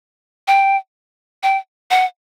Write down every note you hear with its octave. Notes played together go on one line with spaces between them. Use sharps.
G5
G5
F#5